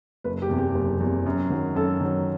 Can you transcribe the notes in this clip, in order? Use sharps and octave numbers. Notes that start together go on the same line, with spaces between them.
F#1 B4
G4
E2 C3
G4
F#1
E2 C3
F#2
D#3 F#3
F#2 A4
D#3 F#3